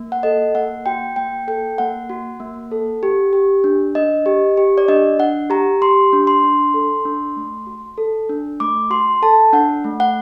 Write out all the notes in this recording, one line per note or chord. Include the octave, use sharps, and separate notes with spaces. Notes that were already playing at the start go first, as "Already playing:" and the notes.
Already playing: A#3
F#5
A4 D#5
A#3 F#5
F#4 G5
A#3 G5
A4 G5
A#3 F#5
F#4
A#3
A4
G4
G4
D4
D4 D#5
G4
G4
D5
D4 D#5
D4 F#5
G4 A#5
G4 C6
D4
C6
D4
A4
D4
A3
F#4
A4
D4
A3 D6
F#4 C6
A4 A5
D4 F#5
A3
F#5